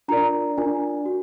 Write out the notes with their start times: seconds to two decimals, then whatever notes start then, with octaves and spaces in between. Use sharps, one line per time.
0.08 D4 F4 A#4 D5 A#5
0.58 D4 F4 A#4 D5 G#5
1.06 F#4